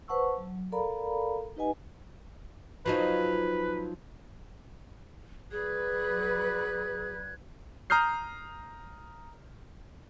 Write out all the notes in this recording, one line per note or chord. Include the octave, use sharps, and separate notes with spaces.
B4 C5 F#5 A5 C#6 E6
F#3
A4 A#4 D5 F5 A#5 B5
D#4 G4 B4 D#5 F#5 G#5
F3 F#3 D#4 B4
F#3 G#4 B4 D5 F#6 G#6
A#5 D#6 F6 G6 C7